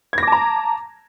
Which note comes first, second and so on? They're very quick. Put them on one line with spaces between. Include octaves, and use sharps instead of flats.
G#6 A#6 D6 A5 A#5